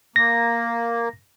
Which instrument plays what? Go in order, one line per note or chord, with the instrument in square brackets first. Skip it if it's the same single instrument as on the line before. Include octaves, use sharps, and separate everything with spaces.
[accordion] A#3 [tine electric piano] A#6